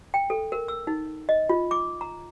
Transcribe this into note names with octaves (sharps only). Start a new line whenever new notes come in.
G5
A4
A#4
E6
D#4
D#5
F4
D6
A#5